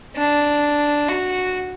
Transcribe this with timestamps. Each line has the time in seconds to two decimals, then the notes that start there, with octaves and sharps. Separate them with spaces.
0.16 D4
1.09 F#4